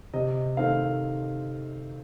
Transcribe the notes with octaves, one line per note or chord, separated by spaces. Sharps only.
C3 D#5
D#3 A3 C4 F5